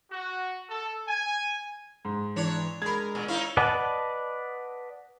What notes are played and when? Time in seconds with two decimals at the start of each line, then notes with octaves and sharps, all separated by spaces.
0.10 F#4
0.69 A4
1.07 G#5
2.05 G#2
2.36 E3 D4 C#5
2.82 G#3 A#4 B5 G#6
3.15 A#2
3.28 D#4 E4 C#5 F5
3.57 B4 D5 D#5 F#5 A5